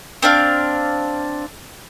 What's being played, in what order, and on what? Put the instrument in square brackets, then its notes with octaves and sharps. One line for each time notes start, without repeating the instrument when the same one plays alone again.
[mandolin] C4 D4 F5